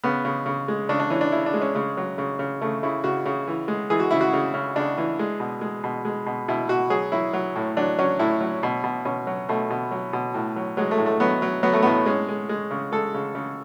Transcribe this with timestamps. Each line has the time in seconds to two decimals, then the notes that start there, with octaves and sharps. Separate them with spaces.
0.04 C#3 B3
0.25 C#3
0.46 C#3
0.68 G#3
0.89 C#3 D4
0.99 D4
1.10 E3 C#4
1.21 D4
1.32 C#3 E4
1.46 D4
1.54 G#3
1.61 C#4
1.75 C#3 G#3
1.97 F#3
2.18 C#3
2.39 C#3
2.61 C#3 A3
2.83 C#3 E4
3.04 C#3 F#4
3.25 C#3
3.48 E3
3.68 G#3
3.90 E3 G#4
4.00 F#4
4.11 C#3 E4
4.21 F#4
4.33 C#3
4.54 C#3
4.76 C#3 D4
4.98 E3
5.19 G#3
5.40 B2
5.61 G#3
5.84 B2
6.05 G#3
6.26 B2
6.48 B2 E4
6.69 B2 F#4
6.90 F#3 G#4
7.12 F#3 E4
7.33 F#3
7.56 A2
7.77 F#3 D4
7.99 F#3 C#4
8.19 A2 E4
8.41 F#3
8.63 B2
8.84 B2
9.05 B2 C#4
9.27 F#3
9.49 B2 A3
9.70 B2
9.91 F#3
10.13 B2
10.34 A2
10.56 F#3
10.77 F#3 G#3
10.91 A3
10.98 A2
11.06 A3
11.20 F#3 B3
11.42 F#3
11.63 F#3 B3
11.73 A3
11.82 A2 B3
12.06 G#3 C#4
12.28 G#3
12.49 G#3
12.71 C#3
12.92 G#3 A4
13.14 C#3
13.35 C#3